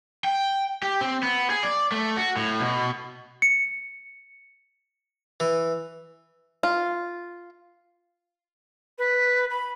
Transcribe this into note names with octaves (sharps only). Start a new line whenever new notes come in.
G5
G4
C4
B3
G#4
D5
A3
F#4
A2
B2
C#7
E3
F4
B4
B5